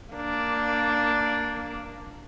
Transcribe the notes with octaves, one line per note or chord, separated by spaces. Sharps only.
A#3 D4